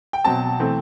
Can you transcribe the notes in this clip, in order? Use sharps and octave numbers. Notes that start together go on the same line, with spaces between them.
G5
B2 F#3 C4 A5
E3 A3 C4